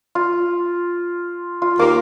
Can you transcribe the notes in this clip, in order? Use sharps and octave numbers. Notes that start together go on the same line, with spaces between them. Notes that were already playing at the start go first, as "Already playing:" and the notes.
F4
F4
D#2 A#3 D6